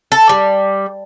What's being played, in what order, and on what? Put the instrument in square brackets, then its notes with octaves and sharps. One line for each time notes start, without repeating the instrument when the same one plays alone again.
[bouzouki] A4
G3